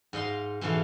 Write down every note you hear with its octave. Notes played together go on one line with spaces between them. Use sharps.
G#2 D#5 F5 C6
G#2 B2 E3 A3 F5